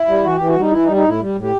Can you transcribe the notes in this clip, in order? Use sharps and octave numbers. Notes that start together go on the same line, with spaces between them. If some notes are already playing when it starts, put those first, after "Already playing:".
Already playing: E4
G3
E3 F#4
E3 G4
F#4
G3 D#4
E3 E4
D#4
G3
D#4
A2 E4
G3
A2
G4